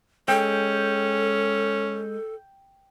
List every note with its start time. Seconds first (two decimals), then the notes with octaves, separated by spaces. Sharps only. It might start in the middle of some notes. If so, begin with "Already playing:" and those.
0.28 G#3 C#4 A4 G5